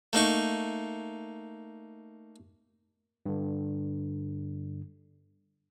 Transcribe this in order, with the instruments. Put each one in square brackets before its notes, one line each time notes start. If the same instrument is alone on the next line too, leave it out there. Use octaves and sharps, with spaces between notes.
[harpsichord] A3 A#3 D#4 C#6
[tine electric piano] G2 D3